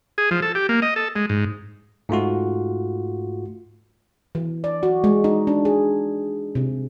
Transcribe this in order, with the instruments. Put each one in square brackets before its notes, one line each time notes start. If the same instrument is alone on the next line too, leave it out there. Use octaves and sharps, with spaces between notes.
[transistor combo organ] G#4
F3
A4
G4
A#3
D#5
A4
G#3
G#2
[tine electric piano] G#2 A3 F4 F#4
[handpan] E3
D5
F#4
G#3
D#4
D4
G#4
C3